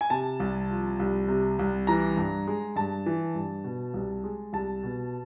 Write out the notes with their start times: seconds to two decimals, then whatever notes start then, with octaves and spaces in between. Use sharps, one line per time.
0.01 G#5
0.10 C3 A5
0.40 C2
0.70 F3
0.99 C2
1.28 C3
1.59 C2
1.87 E3 A#5
2.17 G2
2.47 G#3
2.76 G2 A5
3.06 E3
3.35 G2
3.64 B2
3.94 C2
4.24 G#3
4.53 C2 A5
4.83 B2